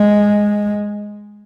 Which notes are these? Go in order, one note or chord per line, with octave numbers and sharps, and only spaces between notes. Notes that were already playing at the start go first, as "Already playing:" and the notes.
Already playing: G#3